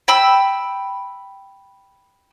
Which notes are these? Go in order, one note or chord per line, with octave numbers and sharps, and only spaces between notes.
G5 B5 E6